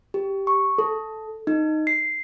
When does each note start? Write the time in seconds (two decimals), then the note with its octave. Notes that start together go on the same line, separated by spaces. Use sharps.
0.14 G4
0.47 C#6
0.78 A4
1.47 D#4
1.87 C7